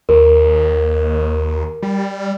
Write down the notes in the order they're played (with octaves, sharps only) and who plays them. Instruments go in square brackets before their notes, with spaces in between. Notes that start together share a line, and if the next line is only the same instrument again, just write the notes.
[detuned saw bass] D#2 [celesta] A#4
[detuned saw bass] G3